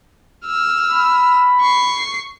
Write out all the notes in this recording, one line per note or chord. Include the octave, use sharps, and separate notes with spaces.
E6 F6
B5
C#6 C7